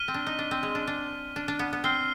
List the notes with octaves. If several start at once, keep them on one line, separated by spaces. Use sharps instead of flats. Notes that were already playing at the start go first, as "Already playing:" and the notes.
Already playing: F6 B6 D#7 G7
C4
D4
D#4
D4
C4
G#3
D4
D4
D4
D4
B3
B3
C4 F6 C7 G7